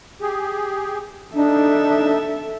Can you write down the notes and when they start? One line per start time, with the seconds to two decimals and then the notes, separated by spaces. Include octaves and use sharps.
0.21 G4 G#4
1.35 D4 D#4 A4 E5